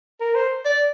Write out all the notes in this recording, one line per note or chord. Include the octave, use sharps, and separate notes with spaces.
A#4
C5
D5